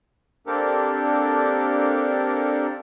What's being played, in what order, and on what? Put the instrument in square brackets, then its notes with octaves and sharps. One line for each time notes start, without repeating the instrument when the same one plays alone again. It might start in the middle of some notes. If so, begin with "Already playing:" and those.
[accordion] A#3 C4 D4 G4 A4 A#4